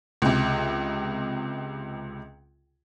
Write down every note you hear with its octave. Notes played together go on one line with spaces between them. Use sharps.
C#2 C3